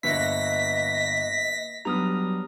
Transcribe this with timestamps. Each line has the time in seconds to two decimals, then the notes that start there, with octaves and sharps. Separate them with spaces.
0.03 G1 A#3 D4 B4 D#5 E5 A#6 B6
1.85 F#3 G3 B3 D4 A#5 D#6 F6